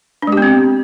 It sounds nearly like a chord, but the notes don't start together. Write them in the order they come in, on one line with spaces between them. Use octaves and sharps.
D4 G#3 G4 B3 C4